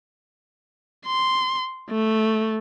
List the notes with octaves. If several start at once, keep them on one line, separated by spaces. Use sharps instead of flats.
C6
A3